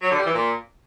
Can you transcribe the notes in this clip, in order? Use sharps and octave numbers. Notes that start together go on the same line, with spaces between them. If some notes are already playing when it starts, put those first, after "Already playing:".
F#3
D3
G3
E3
A#2